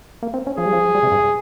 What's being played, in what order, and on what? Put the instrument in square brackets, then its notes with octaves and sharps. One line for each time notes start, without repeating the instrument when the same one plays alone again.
[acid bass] A#3
C4
C#4
[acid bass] F3 [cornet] G#4
[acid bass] G3
F3
G3
C3
G2